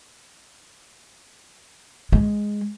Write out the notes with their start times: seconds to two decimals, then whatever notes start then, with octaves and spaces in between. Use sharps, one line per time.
2.12 G#3